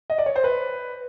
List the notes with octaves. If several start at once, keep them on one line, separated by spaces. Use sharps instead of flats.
D#5
D5
C#5
C5
B4